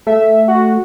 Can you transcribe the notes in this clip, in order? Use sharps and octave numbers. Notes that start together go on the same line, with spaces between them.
A3 E5
F#4